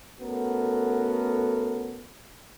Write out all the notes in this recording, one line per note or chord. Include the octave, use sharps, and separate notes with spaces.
A3 B3 C#4 F#4 A4 A#4